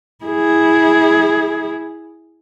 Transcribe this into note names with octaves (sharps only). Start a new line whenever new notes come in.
E4 G#4